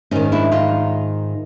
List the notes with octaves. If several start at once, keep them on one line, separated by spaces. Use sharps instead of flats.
G#2 D#3 C#4 D#4
D4 E4
D#4 F4